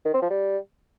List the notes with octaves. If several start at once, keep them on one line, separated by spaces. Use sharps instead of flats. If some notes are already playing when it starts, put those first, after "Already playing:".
D#3
C4
F3
G3